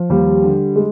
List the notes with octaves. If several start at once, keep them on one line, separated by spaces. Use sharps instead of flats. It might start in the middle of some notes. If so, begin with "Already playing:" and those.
Already playing: F3
D#2 G3
D3
G#3